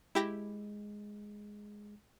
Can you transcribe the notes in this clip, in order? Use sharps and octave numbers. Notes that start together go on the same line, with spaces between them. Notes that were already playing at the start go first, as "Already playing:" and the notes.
G#3 E4 G4 A#6